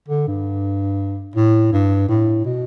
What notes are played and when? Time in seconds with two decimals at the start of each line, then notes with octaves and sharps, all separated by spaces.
0.08 D3
0.27 G2
1.36 A2
1.72 G2
2.09 A2
2.45 B2